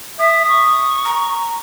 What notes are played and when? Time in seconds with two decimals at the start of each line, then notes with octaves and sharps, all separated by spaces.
0.19 E5 D#6
0.48 C#6
1.05 A#5